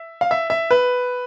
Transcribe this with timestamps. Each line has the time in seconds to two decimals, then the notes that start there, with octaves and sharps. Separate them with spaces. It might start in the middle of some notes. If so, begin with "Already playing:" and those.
Already playing: E5
0.21 F5
0.31 E5
0.50 E5
0.71 B4